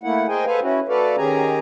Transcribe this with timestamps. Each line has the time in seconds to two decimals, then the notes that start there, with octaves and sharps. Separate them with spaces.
0.03 A3 A#3 E4 F#5
0.28 G#4 A#4 C5 D#5 G5 G#5
0.46 A4 B4 C5 F5 G#5
0.62 C#4 E4 F#4
0.88 A3 F#4 A4 B4 D5 F5
1.18 D#3 C#4 G4 G#4 G#5 A#5